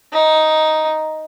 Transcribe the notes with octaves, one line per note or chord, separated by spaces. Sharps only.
D#4